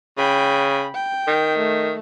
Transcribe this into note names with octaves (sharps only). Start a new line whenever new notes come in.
C#3 G5 B5
G5
D#3
A3